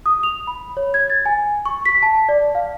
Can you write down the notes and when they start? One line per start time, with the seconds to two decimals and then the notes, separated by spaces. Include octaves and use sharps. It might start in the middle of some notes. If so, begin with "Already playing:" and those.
0.06 D#6
0.23 F7
0.47 B5
0.77 C#5
0.94 G#6
1.10 A6
1.26 G#5
1.66 C#6
1.86 B6
2.03 A5
2.29 D5
2.55 F5